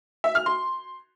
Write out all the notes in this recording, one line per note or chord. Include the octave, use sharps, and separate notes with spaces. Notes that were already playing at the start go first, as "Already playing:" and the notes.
E5
F6
C6